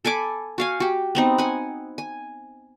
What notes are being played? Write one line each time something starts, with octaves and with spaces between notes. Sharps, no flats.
A4 G#5 B5 D6
F#4 F5 G#5
F#4 G4
B3 C4 D#4
F#5 G#5
G#5